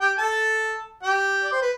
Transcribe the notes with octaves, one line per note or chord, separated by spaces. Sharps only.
G4 G5
A4 A5
G4 G5
D5
C5
B4